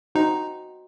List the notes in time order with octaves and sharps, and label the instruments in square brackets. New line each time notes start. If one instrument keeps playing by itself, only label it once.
[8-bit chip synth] D#4 [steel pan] F#4 C5 D#5 G5 A#5